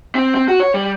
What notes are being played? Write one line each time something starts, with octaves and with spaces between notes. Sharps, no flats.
C4
C4
F#4
C#5
G3